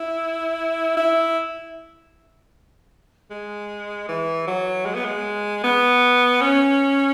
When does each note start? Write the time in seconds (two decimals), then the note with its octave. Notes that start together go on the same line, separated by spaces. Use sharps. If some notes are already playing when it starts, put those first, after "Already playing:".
Already playing: E4
0.97 E4
3.31 G#3
4.09 E3
4.48 F#3
4.86 G#3
4.95 B3
5.05 G#3
5.64 B3
6.41 C#4